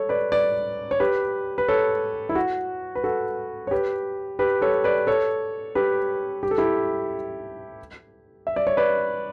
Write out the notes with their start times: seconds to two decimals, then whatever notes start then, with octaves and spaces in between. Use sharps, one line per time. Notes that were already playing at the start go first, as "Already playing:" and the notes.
Already playing: A4 C#5
0.09 B4 D5
0.32 B4 D5
0.91 C#5
1.00 G4 B4
1.58 B4
1.68 A4 C#5
2.29 E4
2.35 F#4
2.95 B4
3.04 F#4 A4
3.67 C#5
3.71 G4 B4
4.39 G4 B4
4.62 A4 C#5
4.84 B4 D5
5.07 A4 C#5
5.75 G4 B4
6.43 G4
6.51 A4
6.58 E4 G4
8.47 E5
8.56 D5
8.67 C#5
8.77 B4 D5